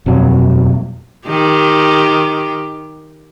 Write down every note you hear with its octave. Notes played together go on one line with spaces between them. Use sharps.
D#1 F2 B2 F#3
D#3 G4